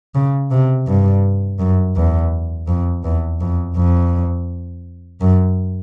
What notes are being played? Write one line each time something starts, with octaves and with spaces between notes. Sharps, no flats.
C#3
C3
G2
F#2
E2
F2
E2
F2
F2
F#2